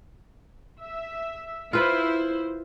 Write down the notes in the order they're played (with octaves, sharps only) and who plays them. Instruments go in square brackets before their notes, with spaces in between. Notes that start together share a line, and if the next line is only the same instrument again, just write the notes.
[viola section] E5
[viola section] E4 C5 [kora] F4 B4